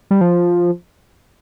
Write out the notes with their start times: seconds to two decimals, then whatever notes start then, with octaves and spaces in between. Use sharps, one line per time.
0.11 G3
0.21 F3